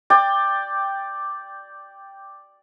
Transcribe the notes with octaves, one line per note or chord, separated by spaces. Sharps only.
D5 G5